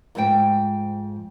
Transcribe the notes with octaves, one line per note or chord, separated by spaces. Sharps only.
F2 G#2 C4 C5 G5